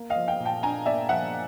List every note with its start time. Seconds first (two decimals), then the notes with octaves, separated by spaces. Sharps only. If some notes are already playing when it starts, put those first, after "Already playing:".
Already playing: A#3
0.10 D#5 F5
0.16 F3
0.28 F5 G5
0.40 A#2
0.46 G5 A5
0.63 D4 G#5 A#5
0.86 A#3 D5 E5
1.09 F3 E5 F#5